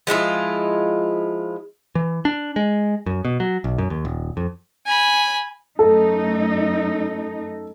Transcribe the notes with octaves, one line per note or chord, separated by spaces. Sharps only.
F3 G#3 E4 F4
E3
D4
G#3
F#2
B2
F#3
B1
F#2
D#2
D#1
F2
G#5 B5
F#2 A3 D#4 A4